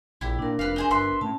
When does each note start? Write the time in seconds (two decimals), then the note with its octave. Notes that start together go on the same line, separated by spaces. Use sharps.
0.21 A#1 E4 G4
0.39 A#2 D4 A#4
0.59 F1 B4 F5
0.76 D#4 G#4 C5
0.91 G1 B4 E5 C6
1.21 A2 C#4 A5